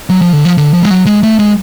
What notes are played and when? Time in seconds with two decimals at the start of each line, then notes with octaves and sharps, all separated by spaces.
0.10 F#3
0.22 F3
0.33 D3
0.45 F3
0.58 D3
0.74 F3
0.82 G#3
0.90 F#3
1.06 G#3
1.23 A3
1.39 G#3